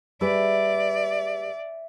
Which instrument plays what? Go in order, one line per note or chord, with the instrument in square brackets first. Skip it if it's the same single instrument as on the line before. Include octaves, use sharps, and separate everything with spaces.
[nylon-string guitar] G3 G#4 B4 [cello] D5 [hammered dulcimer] E5